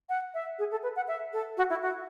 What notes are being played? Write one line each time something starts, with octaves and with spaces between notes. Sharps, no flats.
F#5
E5
G#4
A4
B4
F#5
E5
A4
F#4
E4
F#4